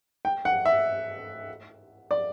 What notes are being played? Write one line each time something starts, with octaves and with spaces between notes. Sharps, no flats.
G5
F#5
E5
D5